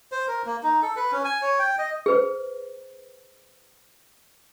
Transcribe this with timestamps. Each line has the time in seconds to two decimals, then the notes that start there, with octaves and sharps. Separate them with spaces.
0.12 C5
0.28 A#4
0.46 A#3
0.63 D#4
0.82 A4
0.96 B4
1.12 C#4
1.25 G#5
1.42 C#5
1.59 G5
1.78 D#5
2.06 G#4 B4 C5